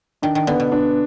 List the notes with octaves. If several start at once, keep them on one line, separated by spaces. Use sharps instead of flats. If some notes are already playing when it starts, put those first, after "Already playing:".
D#3 D4
D#3
D3 B3
B2
D4